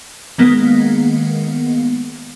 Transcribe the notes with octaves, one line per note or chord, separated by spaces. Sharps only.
D#3 G#3 A#3 B3